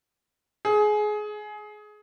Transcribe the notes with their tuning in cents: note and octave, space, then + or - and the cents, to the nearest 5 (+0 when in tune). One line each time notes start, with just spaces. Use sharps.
G#4 +20